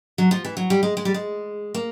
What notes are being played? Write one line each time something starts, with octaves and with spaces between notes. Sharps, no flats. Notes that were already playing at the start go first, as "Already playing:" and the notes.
F#3
F3
E3
F#3
G3
G#3
G#3
G3
G#3
A#3